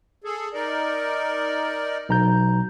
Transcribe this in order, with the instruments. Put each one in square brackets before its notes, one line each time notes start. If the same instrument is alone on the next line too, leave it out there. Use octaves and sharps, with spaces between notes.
[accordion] G#4 A4
D#4 A#4 D5
[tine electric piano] B1 A#5 G6